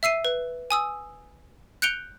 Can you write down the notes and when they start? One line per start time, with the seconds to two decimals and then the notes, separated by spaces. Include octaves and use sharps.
0.03 E5 E6 C7 D#7
0.25 B4
0.70 G#5 D#6 E6
1.82 F#6 G6 C#7 D7 F7 G7